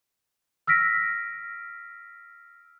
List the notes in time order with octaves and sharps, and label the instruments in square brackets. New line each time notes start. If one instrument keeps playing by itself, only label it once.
[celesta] E6 F6 A#6 B6 D7